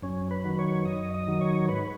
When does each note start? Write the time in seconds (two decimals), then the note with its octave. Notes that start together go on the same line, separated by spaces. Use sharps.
0.02 F#2 C#4
0.31 B4
0.44 D#3 F#3
0.59 C#5
0.85 F#2 D#5
1.14 D#5
1.28 D#3 F#3
1.41 C#5
1.69 G#2 B4